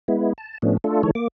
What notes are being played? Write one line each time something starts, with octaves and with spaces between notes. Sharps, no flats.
G#3 B3 E4
A5
A2 F3 A3 B3 C#4 D4
A3 D4 F4 A4
D#3 E3 G#3 A4 C#5
A#3 D6